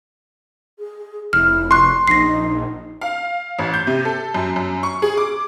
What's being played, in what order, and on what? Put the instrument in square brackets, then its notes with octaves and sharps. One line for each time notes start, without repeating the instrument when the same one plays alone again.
[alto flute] G#4
[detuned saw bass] F1 [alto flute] E4 [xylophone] F6
[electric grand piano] C6 [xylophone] C#6 F#6
[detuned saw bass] A#1 [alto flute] D#4 [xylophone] A#6 C7
[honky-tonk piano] F5
A1
G6
C3
A4
F#2
F#2
C#6
G#4
D6